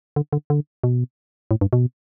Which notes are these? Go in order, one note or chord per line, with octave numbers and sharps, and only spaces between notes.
D3
D3
D3
B2
A2
G2
B2